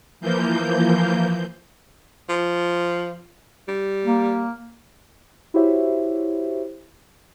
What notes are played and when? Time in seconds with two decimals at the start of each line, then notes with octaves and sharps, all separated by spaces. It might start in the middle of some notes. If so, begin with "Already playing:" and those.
0.21 E3 F3 A#3 G6
2.29 F3
3.68 G3
4.05 A#3
5.54 E4 F#4 G4 C5 C#5 E5